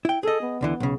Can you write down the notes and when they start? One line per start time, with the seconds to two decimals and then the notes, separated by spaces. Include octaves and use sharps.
0.05 E4 G5
0.23 G#4 A4 D#5
0.42 B3
0.61 D2 D3 E3
0.80 B1 C#3